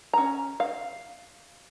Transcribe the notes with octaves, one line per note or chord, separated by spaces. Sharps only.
C#4 A#5
F5